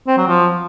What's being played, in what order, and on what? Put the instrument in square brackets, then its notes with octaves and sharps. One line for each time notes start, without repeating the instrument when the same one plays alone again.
[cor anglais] C4
F#3
F3